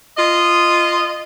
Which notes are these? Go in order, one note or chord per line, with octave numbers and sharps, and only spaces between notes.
F4 D#5